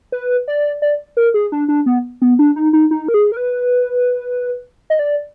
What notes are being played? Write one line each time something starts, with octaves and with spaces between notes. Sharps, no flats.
B4
D5
D5
A#4
G#4
D4
D4
B3
B3
D4
D#4
D#4
D#4
A#4
G#4
A#4
B4
D#5
D5